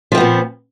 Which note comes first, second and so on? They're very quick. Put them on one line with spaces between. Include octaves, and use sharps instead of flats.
F3 C4 B3 A#2